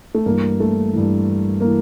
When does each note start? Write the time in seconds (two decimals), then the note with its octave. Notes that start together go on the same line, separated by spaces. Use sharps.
0.15 A3
0.26 G2 E3 A#3
0.60 A3
0.93 G2 E3
1.61 E3 A#3